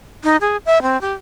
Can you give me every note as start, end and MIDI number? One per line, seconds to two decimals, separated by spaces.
0.24 0.36 63
0.41 0.57 68
0.66 0.82 76
0.82 1.00 60
1.01 1.13 67